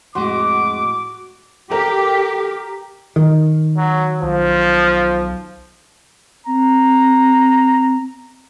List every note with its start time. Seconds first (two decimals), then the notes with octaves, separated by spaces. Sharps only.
0.15 F2 A2 G#3 F#4 C6 D6
1.71 G4 A4 A#4
3.16 D#3
3.77 F#3
4.22 B1 F3
6.47 C4 A#5